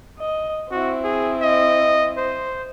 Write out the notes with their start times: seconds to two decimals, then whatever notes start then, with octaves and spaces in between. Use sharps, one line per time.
0.19 D#5
0.71 C4 E4 F#4
1.04 G#4
1.42 D#5
2.17 C5